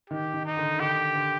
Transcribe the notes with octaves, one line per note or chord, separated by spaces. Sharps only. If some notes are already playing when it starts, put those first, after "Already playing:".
D#3 G4
D#3
D#4
D3
D#3
D3 G4
D3